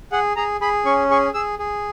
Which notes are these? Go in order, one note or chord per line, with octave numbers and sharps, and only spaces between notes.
G#4 F#5
G#4 A#5
G#4 B5
C#4 C#6
G#4 C#6
G#4 E6
G#4